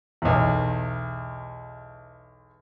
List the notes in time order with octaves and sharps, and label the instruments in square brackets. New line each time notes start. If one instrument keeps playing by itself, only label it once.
[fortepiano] B1 E2